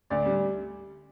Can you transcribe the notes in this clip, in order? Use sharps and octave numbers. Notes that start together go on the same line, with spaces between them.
D2 D5
G3